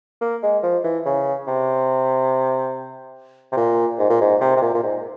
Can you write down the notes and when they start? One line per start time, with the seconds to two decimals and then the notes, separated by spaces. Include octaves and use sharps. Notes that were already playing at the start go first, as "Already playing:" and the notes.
0.21 A#3
0.43 G#3
0.63 F3
0.84 E3
1.05 C#3
1.47 C3
3.52 C3
3.57 A#2
3.99 G#2
4.10 A#2
4.21 G#2
4.41 C3
4.56 C3
4.62 A#2
4.74 A#2
4.83 G#2